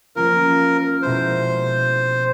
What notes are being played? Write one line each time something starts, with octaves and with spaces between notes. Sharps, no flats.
F3 A#3 C#4 F4 A#4
B2 G#3 B3 E4 C5